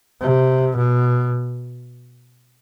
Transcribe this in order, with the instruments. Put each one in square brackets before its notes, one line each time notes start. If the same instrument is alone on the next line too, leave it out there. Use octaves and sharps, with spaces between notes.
[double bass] C3
B2